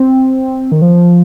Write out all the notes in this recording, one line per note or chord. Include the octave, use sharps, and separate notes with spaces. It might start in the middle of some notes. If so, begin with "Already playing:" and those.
Already playing: C4
D#3
F3